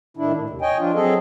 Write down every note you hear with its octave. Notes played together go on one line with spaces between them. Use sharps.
A2 D#3 D4 E4
A2
D#2 C3
C#5 D#5 G5 G#5
F3 D4 F4
F#3 C4 G#4 A4 D#5